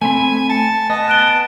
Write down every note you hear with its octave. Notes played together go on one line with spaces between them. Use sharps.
A3 C4 G#5 B5
G#5 A5 C#7
B3 D#5 A5
F#6 D7 G7